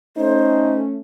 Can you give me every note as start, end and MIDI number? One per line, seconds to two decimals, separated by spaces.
0.17 1.00 57
0.17 1.00 61
0.17 0.82 63
0.17 0.77 72